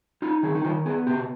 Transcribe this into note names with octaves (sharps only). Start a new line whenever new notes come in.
D#4 F4
D#3 G#4
D#4
D#3 F4
B3 G#4
B2 G4